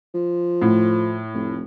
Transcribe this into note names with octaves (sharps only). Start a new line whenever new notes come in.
F3
A2
F1